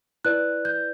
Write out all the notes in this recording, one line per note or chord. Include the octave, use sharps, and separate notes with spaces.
E4 B4 D5 F#6
G6